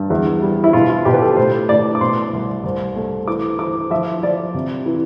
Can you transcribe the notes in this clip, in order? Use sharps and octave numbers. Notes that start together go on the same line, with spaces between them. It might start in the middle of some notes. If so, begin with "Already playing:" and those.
Already playing: G2
E2
G3
E4
B2 F4
F4
B2 G4
B4
A4
A2 C5
A2 D5
D6
B2 C6
C2
C2
A3
E3 D6
E3 D6
F3 E5
F3 D5
C3
E3